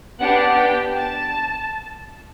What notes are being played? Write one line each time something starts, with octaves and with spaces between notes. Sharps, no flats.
B3 D4 G4 F#5
G5
A5